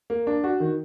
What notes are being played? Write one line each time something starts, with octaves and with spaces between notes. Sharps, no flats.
A#3
D4
F#4
D#3